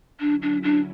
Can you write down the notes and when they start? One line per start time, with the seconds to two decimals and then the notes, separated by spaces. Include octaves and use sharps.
0.20 D3 F#3 C#4 D4 E4
0.42 D4
0.63 D4